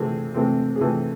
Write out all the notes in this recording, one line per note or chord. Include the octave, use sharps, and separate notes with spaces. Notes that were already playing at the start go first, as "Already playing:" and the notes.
Already playing: C3 E3 A3 C4 G#4
C3 E3 A3 C4
G#4
C3 E3 A3 C4 A4